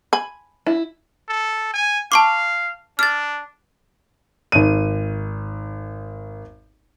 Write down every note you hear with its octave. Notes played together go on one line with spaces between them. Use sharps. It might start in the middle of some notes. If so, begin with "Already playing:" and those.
G#5 B5
E4
A4
G#5
F5 A5 C#6 D6
D4 F6 A6
G#1 D#7